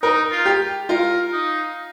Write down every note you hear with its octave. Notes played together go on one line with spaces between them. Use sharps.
D#4 A#4
F4
G4
F4 A#4
D#4